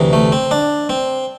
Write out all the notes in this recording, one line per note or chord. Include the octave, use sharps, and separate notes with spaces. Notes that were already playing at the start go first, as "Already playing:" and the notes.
Already playing: D2 C3 E3
A3
C4
D4
C4